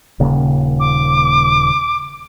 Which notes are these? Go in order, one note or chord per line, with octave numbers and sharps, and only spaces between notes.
D#1 C#3 A#3
D6